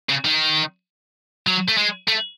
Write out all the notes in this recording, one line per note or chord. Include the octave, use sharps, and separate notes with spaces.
C#3
D#3
F#3
A3
G#3
A3